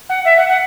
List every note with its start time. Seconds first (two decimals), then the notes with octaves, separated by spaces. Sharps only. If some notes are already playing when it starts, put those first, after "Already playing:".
0.09 F#5
0.25 E5
0.37 F#5
0.48 F#5